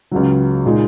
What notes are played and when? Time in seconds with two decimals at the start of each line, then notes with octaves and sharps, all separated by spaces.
0.11 C#2 C#3 F#3
0.66 A#2 G#3 D#4